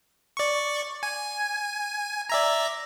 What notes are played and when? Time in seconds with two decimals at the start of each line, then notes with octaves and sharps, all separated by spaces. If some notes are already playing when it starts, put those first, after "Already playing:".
0.37 D5 C#6
1.03 G#5
2.29 D5 E5 A#5